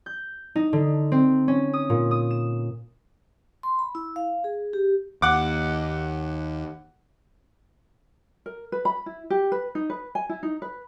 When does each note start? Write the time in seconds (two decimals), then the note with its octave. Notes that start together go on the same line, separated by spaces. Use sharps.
0.06 G6
0.56 D#4
0.73 D3
1.12 C4
1.48 C#4
1.73 D#6
1.90 A#2
2.11 D#6
2.31 E7
3.63 C6
3.79 B5
3.95 E4
4.16 F5
4.44 G#4
4.73 G4
5.22 D#2 F#5 D6
8.46 A#4
8.72 B4
8.85 B5
9.06 E4
9.30 G4
9.52 B4
9.75 D#4
9.90 B4
10.15 G#5
10.29 E4
10.43 D#4
10.62 B4